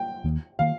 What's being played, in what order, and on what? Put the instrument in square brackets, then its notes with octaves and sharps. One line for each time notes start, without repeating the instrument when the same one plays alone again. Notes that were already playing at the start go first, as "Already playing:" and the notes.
Already playing: [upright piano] G5
[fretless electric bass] D#2 D#3 A#3
[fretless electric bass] D#3 A#3 [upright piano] F5